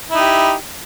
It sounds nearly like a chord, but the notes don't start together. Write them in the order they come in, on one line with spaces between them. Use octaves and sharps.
E4 D#4 G4